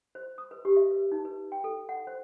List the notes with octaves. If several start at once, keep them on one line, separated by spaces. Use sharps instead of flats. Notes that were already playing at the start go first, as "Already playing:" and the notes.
C5
D#6
B4
G4
E5
B4
D#4
B4
G5
A4
F#5
C5